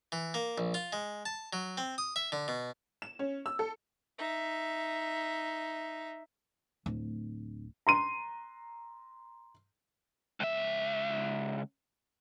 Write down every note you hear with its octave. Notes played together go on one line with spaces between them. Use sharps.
E3
A#3
A#1
F4
G#3
A5
F#3
C4
D#6
E5
D3
B2
E7
C#4
E6
A4
D#4 E5
D1
A#5 C6 D#7
C#2 E5